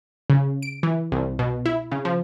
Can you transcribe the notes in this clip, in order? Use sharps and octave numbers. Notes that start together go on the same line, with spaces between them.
C#3
D7
E3
C2
B2
E4
C#3
F3